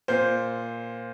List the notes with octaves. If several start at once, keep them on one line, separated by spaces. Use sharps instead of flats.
A#2 C5